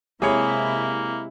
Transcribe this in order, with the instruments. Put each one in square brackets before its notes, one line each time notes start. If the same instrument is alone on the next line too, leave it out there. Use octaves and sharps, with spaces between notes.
[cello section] C3 E4 [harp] G#3 G4 B5 [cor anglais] A#3 [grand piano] G#4 C#5